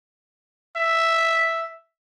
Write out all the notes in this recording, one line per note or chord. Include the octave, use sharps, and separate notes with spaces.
E5